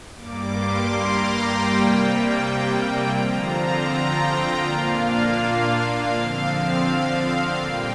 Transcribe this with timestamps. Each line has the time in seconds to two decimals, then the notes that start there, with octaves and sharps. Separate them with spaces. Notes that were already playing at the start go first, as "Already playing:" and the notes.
0.14 G2 G3 A#3 D6
0.51 C6
0.89 A#5
1.26 G5
1.63 C3 G3 A#3
3.12 D3 F3 C4 F4 A#5
3.49 A#5
3.86 G5
4.23 A#5
4.61 A#2 A#3 D4 F4 F5
6.10 D3 F3 C4 F5
7.59 A#2 G3 A#3 G5